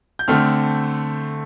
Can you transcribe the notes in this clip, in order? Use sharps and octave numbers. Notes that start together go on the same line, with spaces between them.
G6
D3 A3 C4 F6